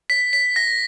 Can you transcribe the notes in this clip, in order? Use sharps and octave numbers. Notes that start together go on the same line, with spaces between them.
B6
B6
A#6